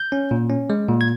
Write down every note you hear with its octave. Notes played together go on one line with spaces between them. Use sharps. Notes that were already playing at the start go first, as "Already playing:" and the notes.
Already playing: G6
C#4
A#2
C#4
G#3
A#2
G#6